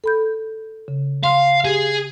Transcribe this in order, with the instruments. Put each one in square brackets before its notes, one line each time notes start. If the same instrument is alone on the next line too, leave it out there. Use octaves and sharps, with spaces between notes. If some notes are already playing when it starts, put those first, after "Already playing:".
[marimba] A4 B5 G6
C#3
[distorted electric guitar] F5 [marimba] C6
[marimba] G4 [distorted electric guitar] G#4